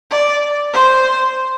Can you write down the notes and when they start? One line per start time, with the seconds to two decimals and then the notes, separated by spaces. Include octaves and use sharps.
0.11 D5
0.73 C5